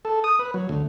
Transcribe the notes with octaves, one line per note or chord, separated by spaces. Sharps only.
A4
D#6
B4
F#3
D2